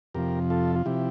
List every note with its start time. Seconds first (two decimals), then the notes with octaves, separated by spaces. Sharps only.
0.14 F2 C3 F3 G4 A#4
0.50 F4 A4
0.76 F4
0.85 C3 F3 E4 G4